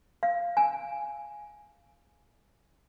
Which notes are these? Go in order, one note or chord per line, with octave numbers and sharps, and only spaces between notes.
F5
G#5